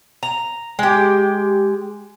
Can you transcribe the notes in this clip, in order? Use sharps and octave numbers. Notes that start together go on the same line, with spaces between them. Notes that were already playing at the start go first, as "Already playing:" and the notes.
A#5
G#3 G4